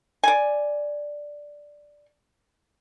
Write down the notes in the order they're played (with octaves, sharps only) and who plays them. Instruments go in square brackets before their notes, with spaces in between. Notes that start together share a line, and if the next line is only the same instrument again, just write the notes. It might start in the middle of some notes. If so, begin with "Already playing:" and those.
[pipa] D5 G#5